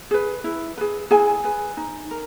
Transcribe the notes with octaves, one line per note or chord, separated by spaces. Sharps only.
G#4 B4
E4
G#4 B4
E4 G#4 G#5
G#4 B4
D#4
A#4